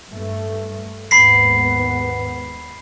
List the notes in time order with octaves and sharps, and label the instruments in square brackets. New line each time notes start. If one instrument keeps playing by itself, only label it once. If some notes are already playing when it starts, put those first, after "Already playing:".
[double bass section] G2 A3
[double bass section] D#2 G#2 B3 [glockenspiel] B5 B6 C7